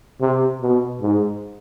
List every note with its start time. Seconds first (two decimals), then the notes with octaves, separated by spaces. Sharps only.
0.21 C3
0.62 B2
1.02 G#2